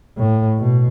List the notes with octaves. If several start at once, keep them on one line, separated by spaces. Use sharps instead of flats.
A2
B2